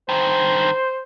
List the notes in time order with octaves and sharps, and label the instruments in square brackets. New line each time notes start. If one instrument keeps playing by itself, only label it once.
[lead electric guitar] G2 D#3 [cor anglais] C5